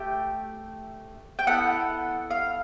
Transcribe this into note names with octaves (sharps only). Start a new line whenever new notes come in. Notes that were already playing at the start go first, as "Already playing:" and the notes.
Already playing: A3 G4 G5
G5
B3 E4 A4 F#5
F5